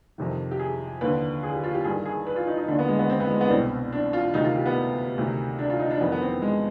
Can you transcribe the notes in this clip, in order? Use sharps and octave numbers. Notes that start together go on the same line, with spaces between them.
F2 C3 D#3
G4
G#4
D#2 D3 B4
G#4
G4
F4
G4
G2 D#3 G#4
G#4
B4
F4
D#4
D#4
D#2 D3 D4
B3
G#3
B3
C4
B3
G#3
B3
D4
C2 B2 C4
D4
F4
D2 C3 D#3 D#4
F4
G4
B3
D2 C3 D#3
D4
F4
D#4
D4
F2 D#3 B3
B3
C4
G#3